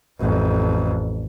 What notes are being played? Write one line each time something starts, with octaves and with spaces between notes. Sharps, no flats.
A1 F2